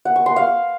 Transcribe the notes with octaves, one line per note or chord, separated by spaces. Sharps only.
F#5
C#6
C6
F5